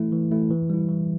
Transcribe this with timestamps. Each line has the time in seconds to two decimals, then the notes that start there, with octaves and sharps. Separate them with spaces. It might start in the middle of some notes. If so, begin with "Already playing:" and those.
Already playing: E3 A3 E4
0.12 E3
0.32 A3 E4
0.51 E3
0.70 G3 E4
0.89 E3